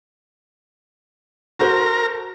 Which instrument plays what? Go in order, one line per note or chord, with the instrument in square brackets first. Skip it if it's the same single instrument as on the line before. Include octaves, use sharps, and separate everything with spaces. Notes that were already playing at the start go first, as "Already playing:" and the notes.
[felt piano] F#4 A4 C5 [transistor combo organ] A#4